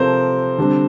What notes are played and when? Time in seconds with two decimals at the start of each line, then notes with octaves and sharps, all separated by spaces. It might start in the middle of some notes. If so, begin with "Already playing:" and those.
Already playing: C3 F3 C4 A4 A#4 C5
0.58 D3 G3 C4